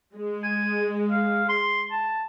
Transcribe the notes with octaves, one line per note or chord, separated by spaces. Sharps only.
G#3
G#5
F5
C6
A5